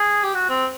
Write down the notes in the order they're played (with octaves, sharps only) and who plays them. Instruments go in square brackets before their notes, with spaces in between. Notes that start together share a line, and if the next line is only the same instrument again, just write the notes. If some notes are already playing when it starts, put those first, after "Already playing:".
Already playing: [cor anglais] G#4
G4
F#4
C4